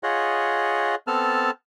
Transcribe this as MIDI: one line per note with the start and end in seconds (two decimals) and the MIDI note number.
0.03 0.95 65
0.03 0.95 68
0.03 0.95 73
0.03 0.95 75
0.03 0.95 78
1.07 1.51 59
1.07 1.51 60
1.07 1.51 69
1.07 1.51 81
1.07 1.51 89